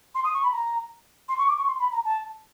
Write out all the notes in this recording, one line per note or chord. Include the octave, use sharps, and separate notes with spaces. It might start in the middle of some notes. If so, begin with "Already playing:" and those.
C6
D#6
C#6
B5
A#5
C6
C#6
D6
C#6
C6
B5
A#5
A5